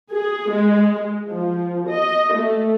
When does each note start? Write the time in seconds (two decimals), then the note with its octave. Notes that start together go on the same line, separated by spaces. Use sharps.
0.13 G#4
0.51 G#3
1.30 F3
1.89 D#5
2.34 A3